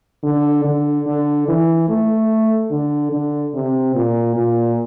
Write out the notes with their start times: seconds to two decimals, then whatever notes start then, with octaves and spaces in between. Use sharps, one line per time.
0.23 D3
0.65 D3
1.07 D3
1.48 E3
1.89 A3
2.71 D3
3.12 D3
3.54 C3
3.95 A#2
4.36 A#2